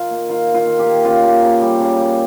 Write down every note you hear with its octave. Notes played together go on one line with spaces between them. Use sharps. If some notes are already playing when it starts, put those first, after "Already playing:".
Already playing: D#3 D#4 F4
A#3
D#3 F4
D#4
F4
D#3
G4
A#3
C#3 F4
A#3
C#3
G3
C#3
A#3